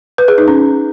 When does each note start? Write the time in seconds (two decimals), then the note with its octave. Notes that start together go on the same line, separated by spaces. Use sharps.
0.18 B4
0.28 G#4
0.38 D#4
0.48 C#4